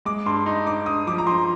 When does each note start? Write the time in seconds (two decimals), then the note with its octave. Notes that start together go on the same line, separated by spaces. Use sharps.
0.05 G#3 D6
0.26 G2 C6
0.46 D#4
0.67 D#4 D6
0.86 G2 D#6
1.07 F3 D6
1.18 A#5
1.27 F3 C6